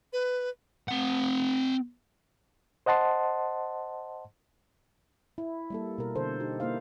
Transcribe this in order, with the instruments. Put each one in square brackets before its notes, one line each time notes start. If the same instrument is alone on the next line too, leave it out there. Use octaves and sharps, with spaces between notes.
[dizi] B4
[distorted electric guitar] C4 F#5
[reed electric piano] C5 D#5 F#5 A5 C6
[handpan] E4
G3 A#3 A4
B2 A#4
D3 A4 C5
D#4 G4
A#3 E4 C5 F5